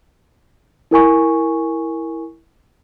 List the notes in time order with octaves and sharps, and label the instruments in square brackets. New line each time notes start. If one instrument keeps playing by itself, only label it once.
[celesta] E4 A#4 G#5 C#6